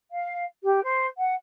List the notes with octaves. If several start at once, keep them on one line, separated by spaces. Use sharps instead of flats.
F5
G4
C5
F#5